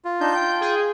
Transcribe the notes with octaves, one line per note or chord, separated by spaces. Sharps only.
F4
D4 D#4 G6
G5
G#4